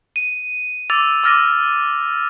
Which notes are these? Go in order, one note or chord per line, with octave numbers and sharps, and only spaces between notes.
D#7
D6 E6 A6 F7
D6 E6 F6 A6 A#6 D#7